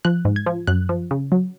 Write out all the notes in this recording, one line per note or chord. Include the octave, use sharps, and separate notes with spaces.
F3 F#6
G#2
G#6
F3
F#2 F#6
F3
C#3
F#3